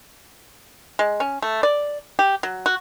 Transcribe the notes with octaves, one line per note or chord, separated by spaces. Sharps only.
G#3
C#4
A3
D5
G4
F#3
F#4